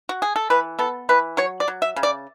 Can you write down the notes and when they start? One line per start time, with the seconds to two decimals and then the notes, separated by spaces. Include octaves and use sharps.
0.09 F#4
0.22 G#4
0.36 A4
0.50 E3 B4
0.79 B3 A4
1.09 E3 B4
1.37 F#3 C#5
1.60 D5
1.68 F#3
1.82 E5
1.96 C#3
2.03 D5